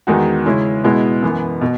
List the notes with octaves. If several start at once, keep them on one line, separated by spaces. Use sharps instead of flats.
E2 D#3 G#3 D#4 F#4
C#3 G#3 C#4 E4
B2 G#3 B3 E4
F#2 E3 B3
B2